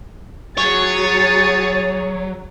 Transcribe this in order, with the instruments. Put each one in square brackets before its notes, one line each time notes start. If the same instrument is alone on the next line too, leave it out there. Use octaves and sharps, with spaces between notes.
[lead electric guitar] F#3 [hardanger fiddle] G#4 [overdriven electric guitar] C#5 [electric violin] A6